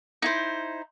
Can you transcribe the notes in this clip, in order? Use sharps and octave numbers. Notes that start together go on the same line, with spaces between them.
D#4 E4 C5